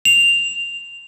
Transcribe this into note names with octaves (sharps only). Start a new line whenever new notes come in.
F7